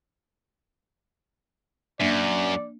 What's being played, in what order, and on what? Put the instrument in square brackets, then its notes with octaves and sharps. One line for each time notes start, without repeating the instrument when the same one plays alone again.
[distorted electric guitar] F#2 [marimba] A#3 D4 E5 [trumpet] D5